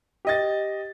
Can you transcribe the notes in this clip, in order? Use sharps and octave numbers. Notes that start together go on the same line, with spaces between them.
G4 D#5 A6